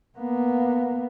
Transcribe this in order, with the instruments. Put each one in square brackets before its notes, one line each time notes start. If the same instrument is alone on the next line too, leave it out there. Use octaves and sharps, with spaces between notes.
[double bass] A#3 B3